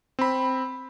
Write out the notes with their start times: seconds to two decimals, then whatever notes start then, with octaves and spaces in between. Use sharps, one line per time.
0.19 C4 B5